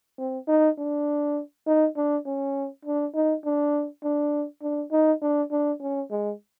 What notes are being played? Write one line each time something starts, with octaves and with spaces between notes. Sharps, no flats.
C4
D#4
D4
D#4
D4
C#4
D4
D#4
D4
D4
D4
D#4
D4
D4
C#4
G#3